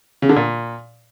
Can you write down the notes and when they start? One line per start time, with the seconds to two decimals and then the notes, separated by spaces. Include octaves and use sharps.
0.22 C#3
0.29 D3
0.36 A#2